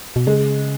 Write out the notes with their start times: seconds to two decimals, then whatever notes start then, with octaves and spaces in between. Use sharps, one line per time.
0.16 B2
0.26 C#3 G#3